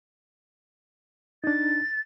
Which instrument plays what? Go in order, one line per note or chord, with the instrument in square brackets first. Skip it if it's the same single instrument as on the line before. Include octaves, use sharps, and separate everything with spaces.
[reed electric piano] D4 D#4 [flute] A6